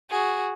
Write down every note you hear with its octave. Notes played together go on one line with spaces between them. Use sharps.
F#4 G#4